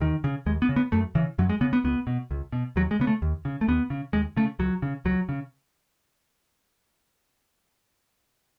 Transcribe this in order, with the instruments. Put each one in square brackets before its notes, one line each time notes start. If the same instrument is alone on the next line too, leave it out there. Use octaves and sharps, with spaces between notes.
[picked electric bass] D#2 D#3
C#3
D#2 G#3
B3
C#3
B3
F#2 A3
C#3 E3
F#2 F#3
G#3
C#3 B3
B3
C#2 B3
B2
C#2
B2
D#2 F#3
G#3
C#3 B3
A3
D#2
C#3
A3
D#2 B3
C#3
D#2 G#3
C#3 A3
C#2 F#3
C#3
C#2 F#3
C#3